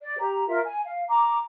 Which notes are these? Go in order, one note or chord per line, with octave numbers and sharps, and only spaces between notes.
D5
G4 A#5
F4 A#4 E5
G#5
F5
A#5 D6